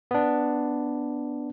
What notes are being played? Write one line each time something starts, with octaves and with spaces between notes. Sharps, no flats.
B3 D4